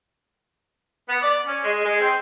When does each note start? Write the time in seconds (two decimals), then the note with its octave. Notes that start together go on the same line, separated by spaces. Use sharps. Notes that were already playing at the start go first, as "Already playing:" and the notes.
1.09 B3
1.22 D5
1.47 C#4
1.64 G#3
1.84 G#3
2.00 C4